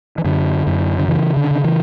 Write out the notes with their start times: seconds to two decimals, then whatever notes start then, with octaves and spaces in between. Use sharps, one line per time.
0.18 E3
0.24 F#2 D3
0.67 F#2
0.99 D3
1.08 C#3 E3
1.37 D3
1.51 C#3
1.64 E3